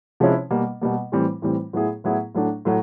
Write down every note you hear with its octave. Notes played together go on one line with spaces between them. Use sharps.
C3 F3 G#3 C#4 E4
B2 G3 A#3
B2 G3 A#3
A2 E3 G3 C4
A2 E3 G3 C4
A2 F#3 B3 E4 G#4
A2 F#3 B3 E4 G#4
A2 F#3 A3 D4
A2 F#3 A3